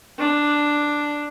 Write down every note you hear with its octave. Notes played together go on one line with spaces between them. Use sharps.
D4